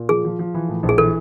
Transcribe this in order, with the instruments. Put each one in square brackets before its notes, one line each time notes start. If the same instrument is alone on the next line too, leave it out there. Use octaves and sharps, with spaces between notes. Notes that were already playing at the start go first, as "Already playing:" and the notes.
Already playing: [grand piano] A#2
[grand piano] F3 [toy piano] G#4
[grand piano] F3
F3
E3
A2
A#1
[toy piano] G#4
[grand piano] E3 [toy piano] A4